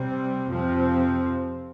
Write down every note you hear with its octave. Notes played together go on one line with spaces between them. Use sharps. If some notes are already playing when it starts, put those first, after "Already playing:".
Already playing: C3 G3 C4
F2 C3 F3 C4